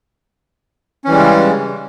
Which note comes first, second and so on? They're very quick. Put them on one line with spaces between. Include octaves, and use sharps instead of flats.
C#4 E3 G3 G#3 C#3